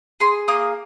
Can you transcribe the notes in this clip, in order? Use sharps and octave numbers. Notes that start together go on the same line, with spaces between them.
G#4 C6
A#3 D#6